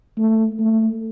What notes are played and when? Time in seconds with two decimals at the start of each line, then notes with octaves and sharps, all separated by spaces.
0.18 A3
0.60 A3